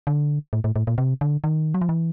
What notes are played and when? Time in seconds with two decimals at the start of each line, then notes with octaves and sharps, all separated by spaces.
0.07 D3
0.53 A2
0.64 A2
0.76 A2
0.87 A#2
0.98 C3
1.21 D3
1.44 D#3
1.74 F#3
1.81 F3
1.89 E3